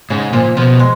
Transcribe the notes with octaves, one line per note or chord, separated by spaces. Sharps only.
G#2 C#3
A#2 F3
B2 F3
G#3